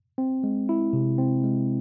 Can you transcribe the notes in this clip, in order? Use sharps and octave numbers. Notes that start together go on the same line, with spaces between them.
C4
G#3
E4
C3
C4
G#3